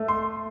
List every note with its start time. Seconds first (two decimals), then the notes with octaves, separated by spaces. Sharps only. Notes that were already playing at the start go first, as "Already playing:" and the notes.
Already playing: A3
0.08 C6